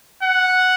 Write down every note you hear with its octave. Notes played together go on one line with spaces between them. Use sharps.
F#5